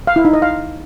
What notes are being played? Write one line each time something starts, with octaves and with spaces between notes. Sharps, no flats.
F5
E4
D#4
D#5
F5